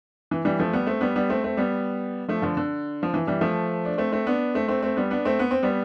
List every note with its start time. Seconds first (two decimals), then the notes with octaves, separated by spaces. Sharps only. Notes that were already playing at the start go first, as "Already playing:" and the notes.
0.31 E3
0.45 E3 G3
0.60 F3 A3
0.73 G3 B3
0.87 A3 C4
1.01 G3 B3
1.15 G3 B3
1.30 A3 C4
1.44 A3 C4
1.57 G3 B3
2.28 F3 A3
2.42 D3 F3
2.57 D3
3.03 F3
3.14 E3
3.27 E3 G3
3.41 F3 A3
3.85 D4
3.98 A3 C4
4.12 A3 C4
4.27 B3 D4
4.55 A3 C4
4.68 A3 C4
4.82 A3 C4
4.97 G3 B3
5.11 B3 D4
5.25 A3 C4
5.39 B3
5.51 C4
5.63 G3 B3